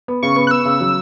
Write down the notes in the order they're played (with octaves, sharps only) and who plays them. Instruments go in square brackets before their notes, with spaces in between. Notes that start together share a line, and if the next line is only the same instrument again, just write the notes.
[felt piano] B3
[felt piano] C#3 [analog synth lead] C#6
[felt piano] B3
[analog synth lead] F#6
[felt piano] B3 [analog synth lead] E6
[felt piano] C#3
F#3